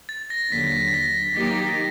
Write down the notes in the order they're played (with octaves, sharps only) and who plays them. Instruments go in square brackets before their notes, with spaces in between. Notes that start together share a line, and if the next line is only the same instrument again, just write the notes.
[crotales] A6
A#6
[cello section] D#2 D3 F#3 [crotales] B6
[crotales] A6
A#6
[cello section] D#3 F#3 A#3 D#4 G4 [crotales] A#6
[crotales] A6
G#6
A6